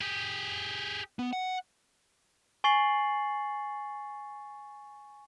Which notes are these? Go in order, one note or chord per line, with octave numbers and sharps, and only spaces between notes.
G4 G#4
B3
F#5
G#5 C#6 A6 C7 F#7